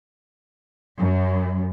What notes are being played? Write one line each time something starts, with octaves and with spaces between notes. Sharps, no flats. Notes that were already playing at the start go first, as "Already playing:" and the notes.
F#2